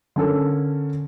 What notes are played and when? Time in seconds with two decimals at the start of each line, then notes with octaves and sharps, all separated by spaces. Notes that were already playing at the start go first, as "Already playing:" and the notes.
0.16 D3 C#4 A4 A#4